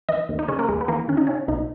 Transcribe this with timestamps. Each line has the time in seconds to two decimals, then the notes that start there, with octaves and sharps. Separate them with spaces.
0.09 E3 D#5
0.29 D#2
0.39 D#4
0.48 C#3 C#4
0.59 A#3
0.69 D#2 G#3
0.81 B3
0.88 E3 A#3
1.08 D#2 C#4
1.17 D#4
1.27 C#3 C#4
1.48 B1 D#4